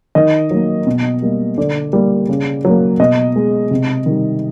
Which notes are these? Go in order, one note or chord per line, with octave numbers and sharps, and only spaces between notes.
D#3 D#5
F#3 A#3
B2
G3 A#3
D3 D5
G3 A#3
C#3
F#3 A#3
B2 D#5
G#3
C3
D#3 G3